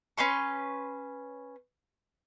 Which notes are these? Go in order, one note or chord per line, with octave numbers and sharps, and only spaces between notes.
C#4 B4 C6 C#6